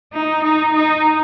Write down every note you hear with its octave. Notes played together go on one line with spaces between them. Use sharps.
D#4
D#4
D#4